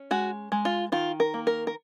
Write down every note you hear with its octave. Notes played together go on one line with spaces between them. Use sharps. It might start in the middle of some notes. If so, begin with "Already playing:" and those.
Already playing: C#4
G#3 F#4
G#3
F4
D#3 F4
A#4
A#3
A#4
A#4